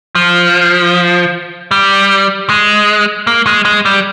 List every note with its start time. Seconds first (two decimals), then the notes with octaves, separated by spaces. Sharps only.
0.15 F3
1.71 G3
2.49 G#3
3.27 A#3
3.47 G#3
3.65 G#3
3.85 G3